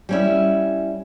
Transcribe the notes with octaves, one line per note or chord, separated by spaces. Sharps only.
G3 C#4 E4